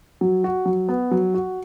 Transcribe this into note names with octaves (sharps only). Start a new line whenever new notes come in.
F#3
F#4
F#3
B3
F#3
F#4